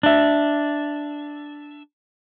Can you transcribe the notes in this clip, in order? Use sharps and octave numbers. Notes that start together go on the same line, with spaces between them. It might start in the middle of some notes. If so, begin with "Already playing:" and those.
D4 E5